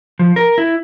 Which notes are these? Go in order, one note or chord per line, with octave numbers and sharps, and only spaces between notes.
F3
A#4
E4